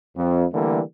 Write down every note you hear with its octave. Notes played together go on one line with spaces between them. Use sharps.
F2
D3 E3 G3 A3 A#3